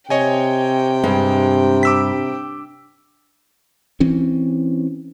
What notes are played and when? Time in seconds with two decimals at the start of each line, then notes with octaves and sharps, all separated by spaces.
0.10 C3 C#5 D#5 G5 G#5
1.04 G2 G#3
1.83 D6 E6 B6
4.00 E3 C4 C#4